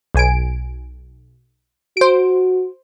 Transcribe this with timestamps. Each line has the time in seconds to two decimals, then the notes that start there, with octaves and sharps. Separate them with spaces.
0.15 B1 G#5 D7
1.97 F#4 C5 D7